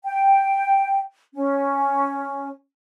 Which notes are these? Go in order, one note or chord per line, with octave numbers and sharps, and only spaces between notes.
G5
C#4